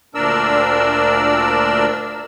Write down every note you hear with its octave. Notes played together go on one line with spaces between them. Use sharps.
D2 A#2 D4 A#4 D5 E6